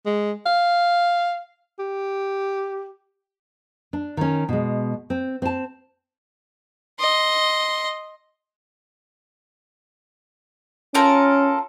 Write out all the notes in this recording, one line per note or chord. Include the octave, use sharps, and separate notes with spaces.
G#3
F5
G4
D4
D#3 C#4
B2 G#3
C4
C4 A5
D#5 C6
C#4 F4 A4 A#4